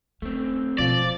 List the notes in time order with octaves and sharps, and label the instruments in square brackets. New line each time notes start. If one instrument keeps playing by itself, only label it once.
[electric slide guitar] A3 C4 [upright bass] C#4
[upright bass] B2 [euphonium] F3 [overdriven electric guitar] D5